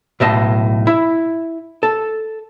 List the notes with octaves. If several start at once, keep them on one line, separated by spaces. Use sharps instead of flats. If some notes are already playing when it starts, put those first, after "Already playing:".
B1 A2 D#5 A5
E4
A4